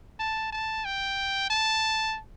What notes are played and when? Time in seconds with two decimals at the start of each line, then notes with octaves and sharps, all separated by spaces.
0.19 A5
0.52 A5
0.85 G5
1.50 A5